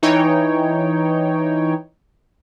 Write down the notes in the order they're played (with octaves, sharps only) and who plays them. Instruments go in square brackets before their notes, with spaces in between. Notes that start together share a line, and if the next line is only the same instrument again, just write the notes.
[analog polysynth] E3 D#4 C#5 G5